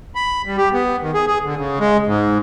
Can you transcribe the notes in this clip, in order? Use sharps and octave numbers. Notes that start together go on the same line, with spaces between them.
B5
G3
G4
B3
D#3
G#4
G#4
D3
C#3
G#3
G#2